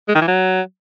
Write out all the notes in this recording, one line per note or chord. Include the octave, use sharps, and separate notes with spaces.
G#3
D#3
E3
F#3